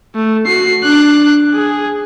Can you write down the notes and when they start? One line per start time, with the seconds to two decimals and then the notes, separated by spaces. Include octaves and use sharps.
0.15 A3
0.47 F#4 C7
0.83 D4 F#6
1.54 G#4